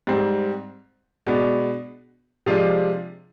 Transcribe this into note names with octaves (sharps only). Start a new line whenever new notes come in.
G#2 G3 C4
B2 G#3 B3 D4
C3 F3 G#3 D4 F4